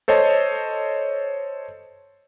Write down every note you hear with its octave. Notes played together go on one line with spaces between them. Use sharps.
A4 C5 C#5 D#5 A5